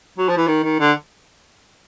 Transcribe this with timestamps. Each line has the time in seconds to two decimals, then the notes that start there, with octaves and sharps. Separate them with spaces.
0.18 F#3
0.28 F3
0.37 E3
0.47 D#3
0.64 D#3
0.80 D3